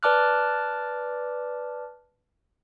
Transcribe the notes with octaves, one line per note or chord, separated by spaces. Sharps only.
B4 D5 A5 D6 F6 F#6